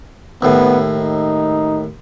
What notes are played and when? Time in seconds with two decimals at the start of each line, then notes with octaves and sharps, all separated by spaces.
0.42 D#2 A2 B3
0.95 D#4